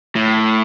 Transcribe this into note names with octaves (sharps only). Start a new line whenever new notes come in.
A2